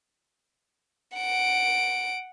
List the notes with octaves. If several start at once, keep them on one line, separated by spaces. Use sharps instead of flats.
F#5 D7